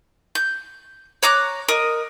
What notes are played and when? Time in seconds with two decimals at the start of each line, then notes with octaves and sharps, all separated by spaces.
0.35 G6
1.23 C#5 A#5 D6 F#6
1.68 A#4 D#5